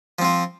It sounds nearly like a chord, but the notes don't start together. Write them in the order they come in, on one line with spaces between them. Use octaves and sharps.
F3 C4 F4